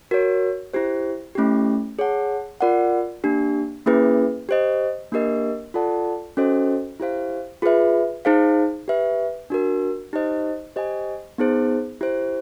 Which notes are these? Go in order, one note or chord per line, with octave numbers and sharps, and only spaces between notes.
F#4 A#4 C#5
E4 G4 C5
A3 C#4 E4 G4
G#4 C#5 F#5 A5
F4 A#4 D5 F#5
A#3 D4 G4
A#3 C#4 E4 G#4 B4
G4 C5 D#5
A#3 D4 G4 A#4 D#5
F4 A4 D5 F#5 A5
C#4 F#4 A4 C5 D#5
E4 G4 C5 F5
F4 G#4 B4 E5
D#4 G#4 C5 F5
G4 B4 E5
D4 F#4 A#4
D#4 G4 C5 D#5
G4 C5 D#5 G#5
B3 D#4 G#4 C5
E4 G4 C5